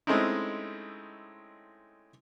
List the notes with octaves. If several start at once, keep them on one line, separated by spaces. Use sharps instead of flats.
G#3 A3 C4 C#4 D#4 E4